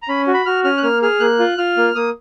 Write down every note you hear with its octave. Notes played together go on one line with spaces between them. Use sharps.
A#5
C#4 B5
F#4
B5
F#4 F6
C#4 F6
F#6
A#3 F6
G#4 F6
A#3 F#6
F4
F4 F6
A#3
A#3 D#6